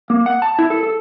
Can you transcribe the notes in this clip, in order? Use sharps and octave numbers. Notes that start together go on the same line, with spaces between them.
A#3
F#5
A5
E4
A4
A4